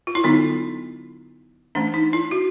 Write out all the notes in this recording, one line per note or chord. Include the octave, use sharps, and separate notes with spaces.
F4
E4
D3 F#3 B3 D4 D#4
E3 A3 C#4 D4
D#4
E4
F#4